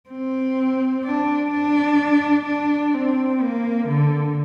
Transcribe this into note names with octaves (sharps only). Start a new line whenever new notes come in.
C4
D4
D4
D4
C4
A#3
D3